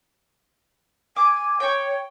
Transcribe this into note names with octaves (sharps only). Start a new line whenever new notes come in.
G#5 D6
C#5 G5 C#6